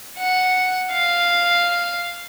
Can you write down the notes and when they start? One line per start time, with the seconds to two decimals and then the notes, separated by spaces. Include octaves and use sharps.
0.18 F#5
0.92 F5